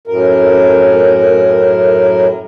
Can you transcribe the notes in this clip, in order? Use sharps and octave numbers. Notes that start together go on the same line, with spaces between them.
F#2 A2 A#4